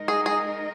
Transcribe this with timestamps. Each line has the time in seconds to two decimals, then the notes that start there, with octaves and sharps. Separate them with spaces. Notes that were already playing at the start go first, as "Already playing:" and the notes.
Already playing: G#3 D#4 A#4 D#5
0.08 G#4
0.26 G#4